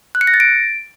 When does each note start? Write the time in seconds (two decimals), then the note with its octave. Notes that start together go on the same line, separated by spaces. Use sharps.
0.15 F#6
0.21 C#7
0.27 A#6
0.34 A6
0.40 D7